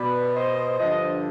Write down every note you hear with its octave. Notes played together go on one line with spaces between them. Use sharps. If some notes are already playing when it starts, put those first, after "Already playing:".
Already playing: B2 B4 D5
C5 D#5
G2 D3 F3 C5 D#5